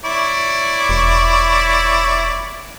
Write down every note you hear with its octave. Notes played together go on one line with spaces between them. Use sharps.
E4 C#5 D5
E1